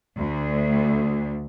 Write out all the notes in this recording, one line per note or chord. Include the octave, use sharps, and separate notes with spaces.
D2